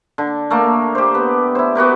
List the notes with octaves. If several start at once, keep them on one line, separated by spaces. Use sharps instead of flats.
D3
A3 A#3 A#4
G4 C5
B3
E4 C5
B3 F#4 G4 A#4